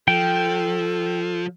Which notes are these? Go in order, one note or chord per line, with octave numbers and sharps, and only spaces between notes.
F3 A4 G5